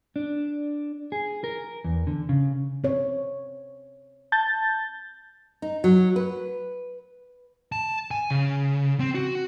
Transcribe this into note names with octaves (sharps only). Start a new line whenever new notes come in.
D4
G#4
A#4
E2
D3
C#3
C4 C#5
A5 G6 A6
D#4
F#3
B4
A5
G#5
C#3
C4
F#4